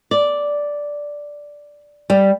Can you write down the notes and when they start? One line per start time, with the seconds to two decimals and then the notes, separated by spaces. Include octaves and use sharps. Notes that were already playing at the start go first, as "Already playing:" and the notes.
0.11 D5
2.10 G3